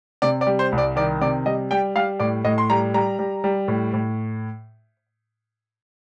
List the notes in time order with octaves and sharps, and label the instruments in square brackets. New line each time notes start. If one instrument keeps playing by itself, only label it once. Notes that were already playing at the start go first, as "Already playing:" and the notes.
[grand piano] C3 D5
D5
G3
C5
C2
D5
D#3 D5
C3 D5
G3 D#5
G3 G5
G3 F5
A2 D5
A2 D#5
C6
G3 A#5
G3 A#5
G3
G3
A2
A2